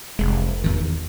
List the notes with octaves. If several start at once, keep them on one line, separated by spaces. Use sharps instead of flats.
F1 C2 G#3
E2 D#3